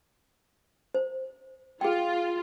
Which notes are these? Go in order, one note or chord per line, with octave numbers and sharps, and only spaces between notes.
C5
F4 G#4 G5